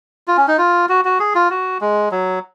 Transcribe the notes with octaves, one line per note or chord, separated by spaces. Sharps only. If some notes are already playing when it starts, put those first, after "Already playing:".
F4
C#4
D#4
F4
F#4
F#4
G#4
F4
F#4
G#3
F#3